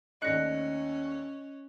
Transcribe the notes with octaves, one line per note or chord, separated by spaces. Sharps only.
D#2 A3 C#4 D4 D#5 F#6 A#6 C#7